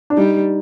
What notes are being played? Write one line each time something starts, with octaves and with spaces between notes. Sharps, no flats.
D4
G3 D#4